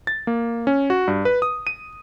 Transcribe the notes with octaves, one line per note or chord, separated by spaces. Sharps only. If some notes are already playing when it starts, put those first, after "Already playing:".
A6
A#3
C#4
F#4
G2
B4
D#6
D#7